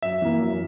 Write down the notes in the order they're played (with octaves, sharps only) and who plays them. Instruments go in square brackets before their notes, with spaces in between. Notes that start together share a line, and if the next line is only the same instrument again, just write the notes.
[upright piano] F#2 [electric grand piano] E5
[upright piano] E3 A#3
F#2